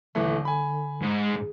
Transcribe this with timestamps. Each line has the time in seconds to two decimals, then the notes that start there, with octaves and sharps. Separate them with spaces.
0.15 D#1 D3 E3 A3
0.45 G#5 B5
1.02 G#2
1.23 G#4